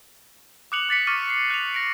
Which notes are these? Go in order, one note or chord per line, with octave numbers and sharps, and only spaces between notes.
D6 D#6 F#6 C#7 F7 F#7
D6 A6 B6 C#7
C#6 D6 F6 A6 D#7
C7
F#6 F7
A#6 D7